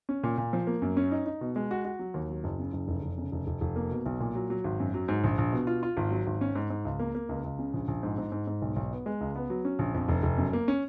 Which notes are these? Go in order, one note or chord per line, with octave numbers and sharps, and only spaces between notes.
C#4
A#2
A#2
F3
A#3
F#2
C#4
D#4
D#4
B2
G#3
F#4
F#4
F#3
D#2
F#3
F#1
C#3
F#1
F1
F1
C#3
F1
F1
F1
A#3
B2
B1
A#2
F#3
F#3
G#1
F#2
F#3
G#2
A#1
A#1
B2
F4
F4
G#1
F#3
G#1
C#4
G#2
G#2
C#2
A#3
A#3
C#2
C#2
C#3
A#1
A#1
G#2
G#2
G#2
G#2
B1
B1
B3
G#3
C#2
B3
F#3
C#4
A#1
F2
F1
F1
F#2
A#3
C#4